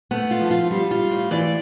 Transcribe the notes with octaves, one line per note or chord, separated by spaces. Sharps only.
A3 B3
F4
F3
F4
G3 F4
F4
A2
E3 D5